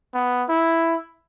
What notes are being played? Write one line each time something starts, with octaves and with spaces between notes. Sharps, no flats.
B3
E4